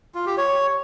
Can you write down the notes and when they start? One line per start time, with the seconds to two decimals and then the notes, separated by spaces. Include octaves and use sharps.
0.15 F4
0.26 G4
0.38 C#5